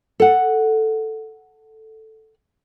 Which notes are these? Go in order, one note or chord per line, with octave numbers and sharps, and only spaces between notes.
A4 F#5